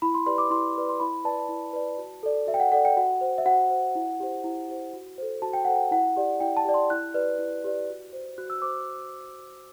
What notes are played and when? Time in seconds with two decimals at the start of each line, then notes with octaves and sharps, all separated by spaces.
0.02 E4 B5
0.14 C6
0.26 G4 B4 D5 C6
0.38 D6
0.50 E4 C6
0.75 G4 B4 D5
0.89 C6
1.00 E4 B5
1.25 B4 D5 A5
1.49 E4
1.73 B4 D5
1.98 F#4
2.23 A4 D5
2.47 F#4 E5
2.54 G5
2.60 F#5
2.72 A4 D5 F#5
2.85 G5
2.97 F#4 F#5
3.21 C5
3.38 E5
3.45 F#4 F#5
3.70 C5
3.95 E4
4.20 G4 C5
4.44 E4
4.68 G4 C5
4.93 F#4
5.18 A4 C5
5.42 F#4 A5
5.53 G5
5.65 A4 C5 F#5
5.75 G5
5.91 E4 F#5
6.17 G4 D5
6.40 E4 G5
6.57 A5
6.65 G4 D5
6.74 C6
6.90 E4 F#6
7.14 G4 B4 D5
7.39 E4
7.64 G4 B4 D5
7.89 F#4
8.13 C5
8.38 F#4 F#6
8.50 E6
8.62 C5 D6